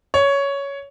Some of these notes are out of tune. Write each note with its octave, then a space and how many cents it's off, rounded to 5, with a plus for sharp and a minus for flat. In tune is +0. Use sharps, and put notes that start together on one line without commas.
C#5 +10